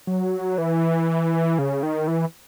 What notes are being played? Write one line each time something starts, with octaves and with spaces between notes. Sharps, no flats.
F#3
E3
C#3
D#3
E3